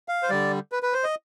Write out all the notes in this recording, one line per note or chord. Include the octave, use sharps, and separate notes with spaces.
F5
C5
D3 G3 D5
B4
B4
C5
D#5